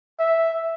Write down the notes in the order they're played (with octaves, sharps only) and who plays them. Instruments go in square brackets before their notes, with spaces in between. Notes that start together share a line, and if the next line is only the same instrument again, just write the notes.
[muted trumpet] E5